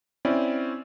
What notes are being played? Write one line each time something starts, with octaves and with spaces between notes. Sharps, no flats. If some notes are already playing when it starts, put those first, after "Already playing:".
C4 C#4 E4 D5